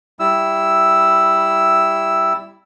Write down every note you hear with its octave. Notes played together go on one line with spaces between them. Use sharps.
G3 E4 E6